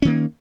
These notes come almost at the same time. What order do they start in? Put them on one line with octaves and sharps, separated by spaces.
C#4 D#3 A#3